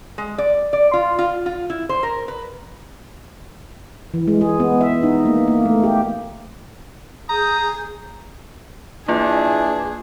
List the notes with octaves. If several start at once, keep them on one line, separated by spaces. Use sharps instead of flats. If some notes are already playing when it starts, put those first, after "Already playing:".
G#3
D5
D5
F4
F4
F4
E4
C5
A#4
B4
E3
G#3
G#4
B3
E5
D#4
A#3
A#3
A3
G4
G#4 A#5 D#6 G6
E3 A#3 D4 F4 G#4